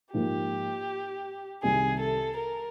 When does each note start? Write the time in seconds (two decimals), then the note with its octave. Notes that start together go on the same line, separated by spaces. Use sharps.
0.13 G#2 F3 A#3 G4
1.63 C2 C3 D#3 G3 G#4
2.00 A4
2.38 A#4